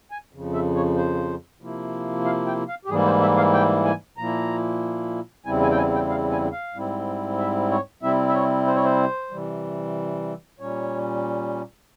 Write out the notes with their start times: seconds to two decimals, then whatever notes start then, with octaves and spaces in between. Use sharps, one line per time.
0.11 G#5
0.33 F2 C#3 F3
0.53 E5
0.76 C#5
0.96 C5
1.61 C3 F3 A#3 E4
2.25 F5
2.47 G5
2.68 F5
2.85 G4
2.89 G#2 E3 G3 A#3 E4 G#4
3.05 C5
3.22 E5
3.37 F5
3.53 G5
3.85 G#5
4.18 A#2 F3 A#3 E4 A#5
5.45 E2 C#3 G3 C4 E4 G#5
5.62 G#5
5.71 G5
5.77 G#5
5.94 G5
6.10 F5
6.31 G#5
6.52 F5
6.74 G#2 G3 C4 E4
7.38 E5
7.71 C#5
8.03 C3 G3 C4 E4 E5
8.28 E5
8.34 C#5
8.67 C5
8.75 C#5
8.84 C5
9.31 C3 E3 G3
10.60 A#2 G3 C#4 C#5